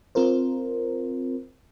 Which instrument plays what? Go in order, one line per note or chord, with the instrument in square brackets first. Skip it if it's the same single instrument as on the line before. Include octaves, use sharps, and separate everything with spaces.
[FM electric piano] C4 F4 A#4 C5